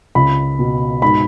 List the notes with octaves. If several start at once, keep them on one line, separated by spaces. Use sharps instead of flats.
C#2 B5
B2
G#2 B5